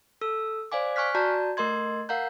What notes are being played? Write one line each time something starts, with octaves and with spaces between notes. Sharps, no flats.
A4 E6
C5 D5 F5 G#5 D6
G#5 C#6 F6 F#6 B6
F#4 D5 A5 A#5 G6
A3 A#4 D#5 C6 G#6
A#4 F5 F#5 A#5 G6